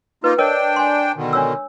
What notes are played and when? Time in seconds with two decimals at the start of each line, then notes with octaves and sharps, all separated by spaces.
0.24 A#3 D#4 F4 B4
0.38 D4 A#4 C#5 D#5 G5
0.76 G#5 C6
1.16 B2 D3 D#3
1.33 D4 C#5 E6